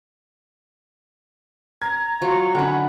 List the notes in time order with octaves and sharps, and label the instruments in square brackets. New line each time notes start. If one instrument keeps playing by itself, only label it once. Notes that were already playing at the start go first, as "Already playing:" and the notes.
[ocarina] A#5 [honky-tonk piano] G#6
[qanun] F#3 [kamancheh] F4 C#6
[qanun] D3 D#4 [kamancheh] C#4 [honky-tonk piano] F#5 B5